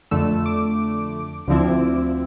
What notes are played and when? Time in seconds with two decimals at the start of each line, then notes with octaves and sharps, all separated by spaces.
0.11 F2 D3 A3 E6
0.46 D6
1.47 D2 D3 F3 C4 E4